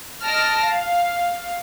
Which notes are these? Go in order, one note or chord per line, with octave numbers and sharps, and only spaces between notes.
D#5 A5 F6 A#6 D7
F5